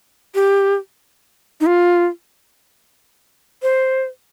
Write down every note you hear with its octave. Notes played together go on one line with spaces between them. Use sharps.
G4
D#4
F4
C5